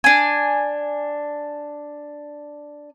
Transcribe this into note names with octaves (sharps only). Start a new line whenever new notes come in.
D4 G#5